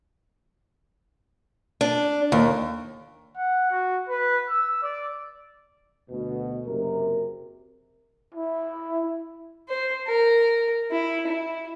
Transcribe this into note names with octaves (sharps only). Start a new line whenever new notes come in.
D4
D#2
F#5
F#4
B4
E6
D5
D2 B2
F#1 C3 A#4
E4
C5
A#4
E4
E4